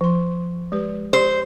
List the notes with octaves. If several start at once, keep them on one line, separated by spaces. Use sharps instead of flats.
F3 C6
G#3 G4 B4
G4 C5